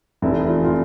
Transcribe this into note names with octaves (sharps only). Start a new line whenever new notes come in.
F1 E2 C3 E4
F4
F4